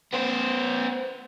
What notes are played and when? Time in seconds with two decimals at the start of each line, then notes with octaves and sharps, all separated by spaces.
0.13 B3 C5